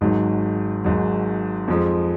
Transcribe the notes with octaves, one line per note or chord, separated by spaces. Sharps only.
G#1 G#2 F#3
G#1 G#2 F#3
F2 F3 G#3